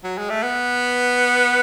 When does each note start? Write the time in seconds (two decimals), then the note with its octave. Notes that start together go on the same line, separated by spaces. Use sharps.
0.04 F#3
0.18 G#3
0.30 A3
0.43 B3